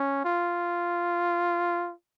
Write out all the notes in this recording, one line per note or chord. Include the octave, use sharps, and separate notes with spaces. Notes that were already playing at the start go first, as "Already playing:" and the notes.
Already playing: C#4
F4